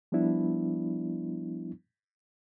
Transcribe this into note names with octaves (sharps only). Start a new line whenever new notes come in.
F3 G3 B3 D4 E4